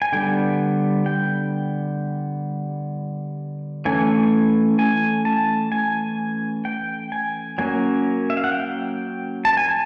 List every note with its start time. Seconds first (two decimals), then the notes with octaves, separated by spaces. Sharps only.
0.02 G#5
0.12 D3 G3 B3 G5
1.06 G5
3.85 E3 A3 C#4 G#5
4.79 G#5
5.25 A5
5.72 G#5
6.65 G5
7.12 G#5
7.58 F#3 A#3 C#4 G#5
8.30 E5
8.37 F5
8.44 F#5
8.52 G5
9.45 A5
9.57 G#5
9.69 A5